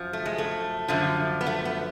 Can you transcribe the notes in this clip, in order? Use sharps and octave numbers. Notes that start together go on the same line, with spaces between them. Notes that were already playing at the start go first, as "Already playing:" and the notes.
Already playing: F#2 F3
A3
G#3
A3
F#2 D3 F3
B3
A3
B3